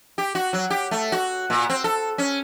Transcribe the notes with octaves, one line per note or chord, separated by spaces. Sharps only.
G4
F#4
F#3
G4
A3
F#4
A#2
C4
A4
C#4